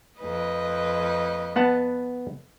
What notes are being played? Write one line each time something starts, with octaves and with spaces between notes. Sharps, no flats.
F2 B4 D#5
B3 F#5 A5